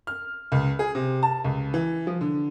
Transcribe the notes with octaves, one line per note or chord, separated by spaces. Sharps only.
F6
C#2
G#4
C3
A5
C#2
E3
F3
D3